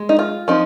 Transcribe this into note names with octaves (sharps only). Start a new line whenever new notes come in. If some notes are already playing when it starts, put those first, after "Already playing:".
Already playing: G#3
D#4
F4
F3 C4 D#4